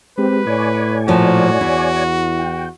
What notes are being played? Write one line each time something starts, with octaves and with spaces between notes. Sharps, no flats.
G#3 C4 G4 B4
A2 C#5 D5 G#5
A#2 F3 F#4
E2 E4
G5